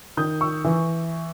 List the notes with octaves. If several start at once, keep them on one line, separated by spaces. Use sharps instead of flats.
D#3 D#6 G6
C#6 E6
E3